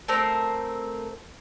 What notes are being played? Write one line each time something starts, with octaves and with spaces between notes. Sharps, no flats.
A3 C4 A#4 C5